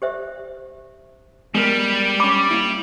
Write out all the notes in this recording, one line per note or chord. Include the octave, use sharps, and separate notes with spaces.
G4 C5 E5
G3 G#3 B3 A#4
C#4 B5 D6
A#3 E4